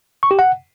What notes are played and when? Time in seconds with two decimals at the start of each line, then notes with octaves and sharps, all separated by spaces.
0.23 C#6
0.31 G4
0.39 F#5